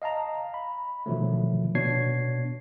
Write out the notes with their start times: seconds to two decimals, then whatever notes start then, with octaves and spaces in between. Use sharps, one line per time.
0.02 D#5 F5 A5 A#5
0.54 B5
1.06 B2 D3 D#3 F3 F#3 A3
1.75 B2 B3 D4 C#5 G#6 C7